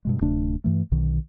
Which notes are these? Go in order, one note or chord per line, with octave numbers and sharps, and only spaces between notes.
G2 B2 G#3
D1 C3 A3 D4
G2 E3 A3
B1 B2 D3 D#3